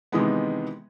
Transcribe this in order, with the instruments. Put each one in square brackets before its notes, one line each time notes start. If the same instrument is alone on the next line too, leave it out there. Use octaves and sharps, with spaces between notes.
[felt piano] C3 D#3 E3 G#3 B3